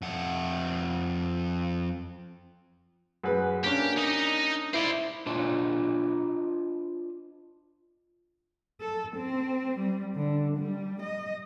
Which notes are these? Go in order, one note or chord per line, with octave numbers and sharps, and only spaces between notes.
F2 F#5
F#2 G#4 B4
A#3 C#4 D4 G4
D#4 D#5
E4 C5 D5
D4 F4 C5 D#5
A4
C4
G3
D3
G3
D#5